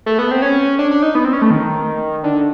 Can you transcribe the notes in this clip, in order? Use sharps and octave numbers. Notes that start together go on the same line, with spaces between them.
A3
B3
C4
C#4
D4
D4
D#4
B3
C4
C#4
A3
D#3
D3